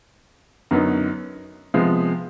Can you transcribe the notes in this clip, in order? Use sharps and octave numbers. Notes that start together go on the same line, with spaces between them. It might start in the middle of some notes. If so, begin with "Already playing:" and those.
F#2 D3 F#3 B3 D#4
C3 F3 G#3 B3